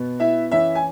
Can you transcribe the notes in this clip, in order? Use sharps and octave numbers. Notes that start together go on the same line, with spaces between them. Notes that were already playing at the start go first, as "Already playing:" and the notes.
Already playing: B2 B3
E4 E5
E3 C#4 E4 E5
G#5